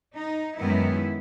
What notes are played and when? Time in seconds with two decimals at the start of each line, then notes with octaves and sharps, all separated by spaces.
0.14 D#4
0.58 F#2 D#3 G#3 B3 E4